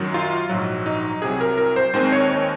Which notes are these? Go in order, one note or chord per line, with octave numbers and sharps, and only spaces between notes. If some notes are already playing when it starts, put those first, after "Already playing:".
Already playing: F#2 D#3 F#3
F4
A#1 G#2 F#3
D#4
C2 C3 F#3 G#4
A#4
A#4
C5
D#2 D#3 G#3 C4 C5
C#5
C#5